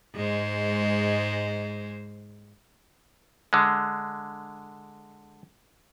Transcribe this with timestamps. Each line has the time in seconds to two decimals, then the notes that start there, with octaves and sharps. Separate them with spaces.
0.14 G#2 G#3 C5
3.53 D3 G#3